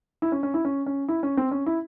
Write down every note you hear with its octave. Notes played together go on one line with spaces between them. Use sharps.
E4
C#4
C#4
E4
C#4
C#4
E4
C#4
C4
C#4
E4